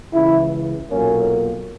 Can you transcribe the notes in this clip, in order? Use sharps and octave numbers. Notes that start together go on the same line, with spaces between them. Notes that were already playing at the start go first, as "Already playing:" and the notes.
C#2 C#3 E3 E4
B1 A#2 F#3 A#3 C#4